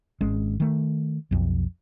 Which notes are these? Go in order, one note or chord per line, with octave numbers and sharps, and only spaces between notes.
G#1 G#3 C#4
D#3 A3
B1 F2